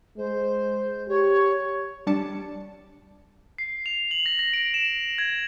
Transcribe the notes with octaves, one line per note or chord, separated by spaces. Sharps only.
G#3 C5
G4 C#5
G3 D4 A5 D6 C#7
C7
F7
F#7
A#6
A#6
D7
E7
G#6